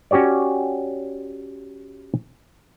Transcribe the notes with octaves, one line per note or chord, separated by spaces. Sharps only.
C#4 F#4 G4 C#5 D5